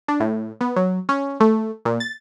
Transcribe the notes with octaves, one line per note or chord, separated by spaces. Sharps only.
D4
A2
B3
F#3
C#4
A3
A#2
A6